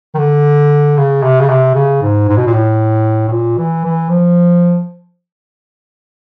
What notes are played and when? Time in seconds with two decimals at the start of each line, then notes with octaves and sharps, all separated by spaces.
0.14 D#3
0.19 D3
0.97 C#3
1.23 C3
1.40 C#3
1.49 C3
1.75 C#3
2.02 G#2
2.28 G#2
2.37 B2
2.46 A#2
2.53 A2
3.28 A2
3.32 A#2
3.58 E3
3.85 E3
4.10 F3